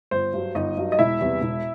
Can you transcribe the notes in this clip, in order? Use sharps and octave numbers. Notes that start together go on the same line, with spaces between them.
G1 C5
G2 F#3
G1 D#4 D#5
G2 F#3
D#5
E1 E4 E5
E2 C3 E3 G3
E1